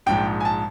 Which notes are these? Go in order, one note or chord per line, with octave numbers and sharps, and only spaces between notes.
A#1 G#2 F3 G5
G#5
A5